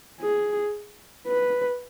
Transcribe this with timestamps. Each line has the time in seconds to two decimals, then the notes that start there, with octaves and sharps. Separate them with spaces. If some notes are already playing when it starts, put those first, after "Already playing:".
0.21 G#4
1.28 B4